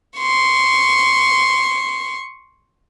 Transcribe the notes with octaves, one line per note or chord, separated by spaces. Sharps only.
C6 C#6